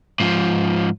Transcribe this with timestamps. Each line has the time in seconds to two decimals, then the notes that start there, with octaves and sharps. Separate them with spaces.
0.20 G#2 F3